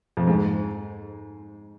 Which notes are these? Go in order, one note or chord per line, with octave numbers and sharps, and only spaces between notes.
F2
G#2